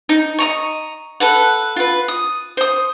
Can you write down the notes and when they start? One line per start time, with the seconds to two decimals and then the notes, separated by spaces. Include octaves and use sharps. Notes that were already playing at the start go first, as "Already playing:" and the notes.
0.09 D#4
0.38 D#5 A#5 C#6
1.20 A4 B4 F#5
1.76 F4 B4
2.08 D#6
2.57 C5 D#6